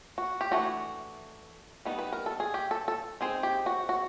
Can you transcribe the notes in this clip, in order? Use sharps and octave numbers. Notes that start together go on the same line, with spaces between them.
F#4
G4
E3 A3 D4 F#4
G3 B3 D#4
B4
A#4
A4
G#4
G4
A4
A4
G#3 C4 D#4 G#4
G4
F#4
F#4